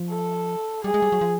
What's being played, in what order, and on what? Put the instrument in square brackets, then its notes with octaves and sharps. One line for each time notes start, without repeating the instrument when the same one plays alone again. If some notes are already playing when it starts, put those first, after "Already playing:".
Already playing: [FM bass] F3
[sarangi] A4
[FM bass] G3 [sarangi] G#4
[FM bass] G#3
G3
F#3
F3